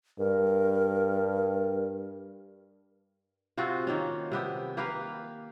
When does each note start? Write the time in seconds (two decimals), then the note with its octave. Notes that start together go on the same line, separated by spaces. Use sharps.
0.19 G2 A#4
3.57 C3 C4 F4 F#4
3.87 D#3 A#3 C#4
4.32 C3 B3 G4
4.77 A#3 G4 B4 F5